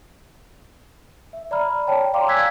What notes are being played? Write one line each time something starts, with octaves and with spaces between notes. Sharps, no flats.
E5
D5 A#5 B5 F6
C#5 D5 G5 A5
D5 F5 G5 A#5 C6 D6
F5 G#5 E6 F#6 G#6 B6